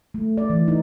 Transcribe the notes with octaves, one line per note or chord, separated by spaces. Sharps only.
A3
D5
E3
D#4